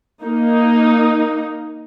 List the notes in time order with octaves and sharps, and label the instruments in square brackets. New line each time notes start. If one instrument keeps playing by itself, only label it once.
[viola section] A#3 D#4